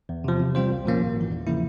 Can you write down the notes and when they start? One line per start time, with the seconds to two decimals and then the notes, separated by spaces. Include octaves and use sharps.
0.09 E2
0.24 C3 F3
0.40 C3
0.55 G3 C4 F4 C5
0.70 C2
0.86 A#2 F3 A#3 C#4
1.01 G#1
1.16 G#2 E3
1.31 E2
1.47 C#3 F3 A#3 E4